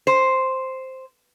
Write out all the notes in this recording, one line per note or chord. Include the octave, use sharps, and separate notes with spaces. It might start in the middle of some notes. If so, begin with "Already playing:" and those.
C5